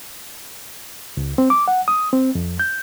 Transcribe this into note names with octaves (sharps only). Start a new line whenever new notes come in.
C#2
C4
D6
F#5
D#6
C4
F2
G6